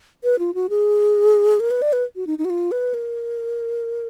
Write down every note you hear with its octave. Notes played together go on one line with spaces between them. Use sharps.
B4
F4
F#4
G#4
A#4
B4
D5
B4
F#4
D#4
D#4
F#4
F4
B4
A#4